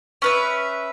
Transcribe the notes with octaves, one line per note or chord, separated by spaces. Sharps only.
C#4 B4 E5